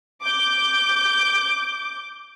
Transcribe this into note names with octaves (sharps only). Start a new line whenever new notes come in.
D6 G6